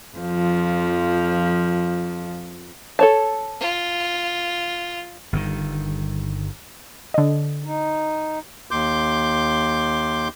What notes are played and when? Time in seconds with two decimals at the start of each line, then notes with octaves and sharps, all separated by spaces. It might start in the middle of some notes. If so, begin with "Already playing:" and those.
0.18 F2 F3
2.99 A4 C#5 A5
3.60 F4
5.33 G1 G2 D3 D#3
7.14 D3 D#5
7.64 D#4
8.71 D#2 C6 D6 G6